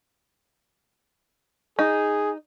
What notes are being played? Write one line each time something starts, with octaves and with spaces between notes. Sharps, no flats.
D#4 G#4